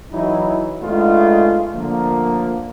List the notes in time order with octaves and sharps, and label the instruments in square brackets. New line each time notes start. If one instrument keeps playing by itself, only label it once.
[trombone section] E3 F#3 D#4 E4
G#3 A3 B3 D4 D#4 F4
D3 F3 A3 A#3